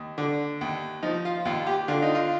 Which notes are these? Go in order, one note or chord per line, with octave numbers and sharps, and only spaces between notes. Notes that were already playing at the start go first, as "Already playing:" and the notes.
Already playing: D#2
D3
D#2
F3 D#4
F4
D#2 F4
G4
D3 F4
D#4
F4